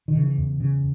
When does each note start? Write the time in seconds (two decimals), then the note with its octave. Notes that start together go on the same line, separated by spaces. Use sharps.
0.08 D#3
0.15 C#3
0.23 E3
0.38 E2
0.60 C#3